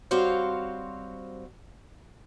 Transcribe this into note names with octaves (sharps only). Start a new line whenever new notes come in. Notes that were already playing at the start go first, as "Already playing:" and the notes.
G3 C4 F#4 C5 C#5 F5